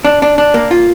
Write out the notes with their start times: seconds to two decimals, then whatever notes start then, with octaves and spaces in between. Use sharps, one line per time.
0.05 D4
0.22 D4
0.38 D4
0.54 A#3
0.71 F4